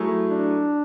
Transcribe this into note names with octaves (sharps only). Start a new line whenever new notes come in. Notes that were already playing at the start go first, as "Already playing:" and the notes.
Already playing: F#3 A3 E4 G#4
D4